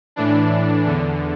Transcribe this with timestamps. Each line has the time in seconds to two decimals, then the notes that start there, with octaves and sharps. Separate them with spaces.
0.16 A2 E3 D4
0.87 E2 D3